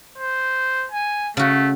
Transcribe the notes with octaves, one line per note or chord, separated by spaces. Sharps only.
C5
G#5
C#3 A3 F#4